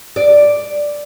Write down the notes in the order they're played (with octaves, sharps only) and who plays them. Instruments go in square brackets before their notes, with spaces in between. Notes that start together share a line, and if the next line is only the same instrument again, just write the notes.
[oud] D5